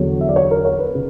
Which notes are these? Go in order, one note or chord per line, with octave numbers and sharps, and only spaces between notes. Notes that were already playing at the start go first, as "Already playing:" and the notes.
Already playing: E2 D3 F#3 C#5
E5
D5
C#5
A#4
C#5
B4
C#3